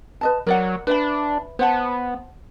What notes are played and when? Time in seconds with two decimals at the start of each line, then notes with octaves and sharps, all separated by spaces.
0.21 B4 D#5 A5
0.47 F#3 A#4 D5 F#5
0.87 D4 B4 E5 B5
1.59 B3 C5 F#5 A5